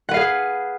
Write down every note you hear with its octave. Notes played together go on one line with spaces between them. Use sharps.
G#4 B4 F5 F#5